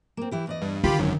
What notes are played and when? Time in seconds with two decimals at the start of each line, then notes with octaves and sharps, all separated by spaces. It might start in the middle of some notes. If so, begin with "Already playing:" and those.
0.17 A#3 C4
0.31 E3 E4 G4
0.47 E2 D5 D#5
0.62 G2
0.84 D3 D#3 F4 G4 B5
0.99 G#1 F#2